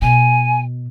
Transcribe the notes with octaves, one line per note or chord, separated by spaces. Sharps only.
B2 G#5